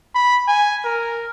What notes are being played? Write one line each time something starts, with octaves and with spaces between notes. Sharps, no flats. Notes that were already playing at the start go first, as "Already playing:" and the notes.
B5
G#5
A#4